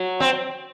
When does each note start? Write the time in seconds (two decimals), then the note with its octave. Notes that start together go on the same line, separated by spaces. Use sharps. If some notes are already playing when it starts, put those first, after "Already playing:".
Already playing: F#3
0.20 C4